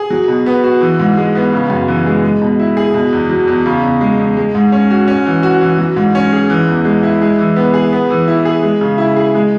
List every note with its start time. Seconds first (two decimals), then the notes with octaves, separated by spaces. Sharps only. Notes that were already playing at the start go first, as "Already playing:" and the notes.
Already playing: G#4
0.10 F#3
0.28 B2
0.46 B3
0.64 F#4
0.81 E3
0.99 G#2
1.17 G#3
1.35 B3
1.53 C#3
1.70 F#2
1.88 E3
2.06 G#3
2.24 G#3
2.41 B2
2.59 E4
2.77 G#4
2.94 B2
3.13 E2
3.29 F#3
3.48 E2
3.66 C#3
3.83 E2
4.01 G#3
4.19 E2
4.37 G#3
4.55 G#2
4.72 C#4
4.90 F#4
5.08 C#4
5.26 E3
5.43 F#4
5.61 E3
5.78 F#3
5.96 G#2
6.15 C#4
6.33 G#4
6.50 E3
6.68 E2
6.85 G#3
7.03 E4
7.22 G#3
7.39 E3
7.56 B3
7.74 G#4
7.93 B3
8.10 E3
8.28 E4
8.45 G#4
8.63 G#3
8.81 C#3
8.98 E4
9.16 G#4
9.35 G#3